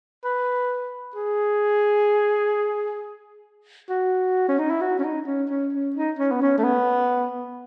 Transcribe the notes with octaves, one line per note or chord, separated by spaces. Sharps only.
B4
G#4
F#4
C#4
D#4
E4
F#4
C#4
D#4
C#4
C#4
C#4
D#4
C#4
B3
C#4
A3
B3